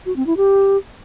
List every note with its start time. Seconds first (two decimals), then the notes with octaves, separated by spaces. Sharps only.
0.06 F#4
0.16 C4
0.27 E4
0.37 G4